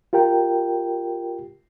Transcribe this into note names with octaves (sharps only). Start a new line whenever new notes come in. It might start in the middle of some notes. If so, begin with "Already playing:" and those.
F4 G4 A#4 G5